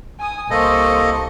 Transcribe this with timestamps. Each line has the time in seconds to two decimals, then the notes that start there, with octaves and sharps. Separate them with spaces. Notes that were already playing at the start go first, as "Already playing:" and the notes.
0.20 G#5 D#6
0.51 C2 A#3 A4 C5 D#5 C#6